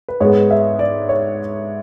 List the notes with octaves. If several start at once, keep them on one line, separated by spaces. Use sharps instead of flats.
B4
G#2 G#3 B3 C#5
E5
D5
C#5